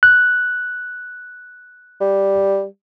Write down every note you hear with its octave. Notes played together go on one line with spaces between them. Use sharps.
F#6
G3